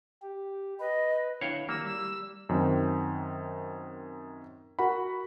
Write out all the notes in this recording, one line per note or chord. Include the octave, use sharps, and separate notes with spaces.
G4
B4 D#5
D3 E4 C#5 F5 G5
D#3 G3 A#3 E6
G3 E6
F#2 D#3 C4
F#4 A#4 F#5 B5